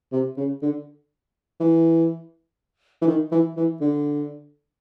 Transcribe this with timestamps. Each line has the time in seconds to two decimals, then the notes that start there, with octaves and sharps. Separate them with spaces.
0.12 C3
0.37 C#3
0.62 D3
1.60 E3
3.02 E3
3.07 D#3
3.32 E3
3.57 E3
3.81 D3